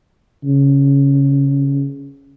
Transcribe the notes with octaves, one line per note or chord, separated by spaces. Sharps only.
C#3